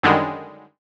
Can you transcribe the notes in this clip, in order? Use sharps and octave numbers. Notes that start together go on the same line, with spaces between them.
F#2 D3 D#3 G3 G#3